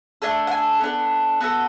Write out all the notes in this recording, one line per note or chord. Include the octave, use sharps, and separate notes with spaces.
A3 D4 A4 G#5
F#5
G#5
B3 D4 A4
B3 F#4 A4